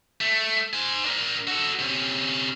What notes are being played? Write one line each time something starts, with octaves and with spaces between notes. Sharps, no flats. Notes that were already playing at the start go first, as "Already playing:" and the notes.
A3
C5 G#5
D4 A#4
F#4 A4
C3 C#4